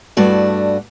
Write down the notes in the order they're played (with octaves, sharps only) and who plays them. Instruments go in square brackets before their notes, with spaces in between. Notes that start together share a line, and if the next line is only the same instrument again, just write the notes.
[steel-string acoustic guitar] G2 A3 F#4 D5